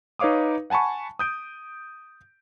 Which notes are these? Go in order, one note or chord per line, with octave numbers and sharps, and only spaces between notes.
D#4 B4 C#5 F5 D6 D#6
F#5 G#5 A5 B5 C#6
D#6 G6 D7